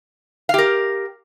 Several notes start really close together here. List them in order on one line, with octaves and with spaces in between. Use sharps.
F5 G4 A#4